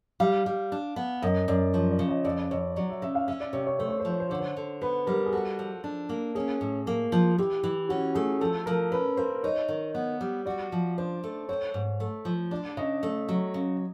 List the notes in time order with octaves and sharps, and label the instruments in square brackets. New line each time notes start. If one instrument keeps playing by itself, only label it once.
[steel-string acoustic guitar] G3 [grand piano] F5
[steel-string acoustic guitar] G3
D4
B3
[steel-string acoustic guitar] F#2 [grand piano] D#5
[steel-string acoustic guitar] F#2 [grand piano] D5
[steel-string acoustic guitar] F3 [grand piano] C#5
[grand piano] D5
[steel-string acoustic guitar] C#3
[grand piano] D#5
[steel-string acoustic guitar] F2 [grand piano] D5
[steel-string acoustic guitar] F2 [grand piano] C#5
[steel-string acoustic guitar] F#3 [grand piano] D5
[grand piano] E5
[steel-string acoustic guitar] C#3 [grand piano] E5
[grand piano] F5
[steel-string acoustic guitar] C#4 [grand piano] E5
[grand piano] D5
[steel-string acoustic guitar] C3 [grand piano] C#5
[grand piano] C#5
[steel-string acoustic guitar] A3 [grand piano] C5
[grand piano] C#5
C5
[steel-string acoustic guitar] F3
[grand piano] C#5
C5
[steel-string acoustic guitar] D3 [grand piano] C#5
[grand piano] C5
[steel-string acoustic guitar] D3
[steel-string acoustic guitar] B3 [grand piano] B4
[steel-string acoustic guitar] G3 [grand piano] A#4
[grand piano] G#4
[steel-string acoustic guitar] F#4 [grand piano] A4
[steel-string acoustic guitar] F3
D4
A#3
[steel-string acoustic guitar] C#4 [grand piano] G#4
[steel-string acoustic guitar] A2
A#3
F3
[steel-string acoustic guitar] E3 [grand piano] G4
[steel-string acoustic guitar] E3
[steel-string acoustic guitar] C#4 [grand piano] F#4
[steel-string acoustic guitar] A3 [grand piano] G#4
[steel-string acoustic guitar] F3 [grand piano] A4
[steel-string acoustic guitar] F3 [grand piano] A#4
[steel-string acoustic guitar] C#4 [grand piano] B4
[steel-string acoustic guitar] A#3 [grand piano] C5
[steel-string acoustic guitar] D#4 [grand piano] C#5
[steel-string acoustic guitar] D#3
B3
G3
[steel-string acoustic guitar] F#4 [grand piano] D5
[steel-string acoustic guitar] F3
[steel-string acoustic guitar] D4 [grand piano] C5
[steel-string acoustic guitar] A3
[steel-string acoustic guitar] C4 [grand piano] C#5
[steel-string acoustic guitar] G#2
A3
F3
[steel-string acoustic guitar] D4 [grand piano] D5
[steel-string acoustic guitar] C#3 [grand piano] D#5
[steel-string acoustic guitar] A3
F#3
C#3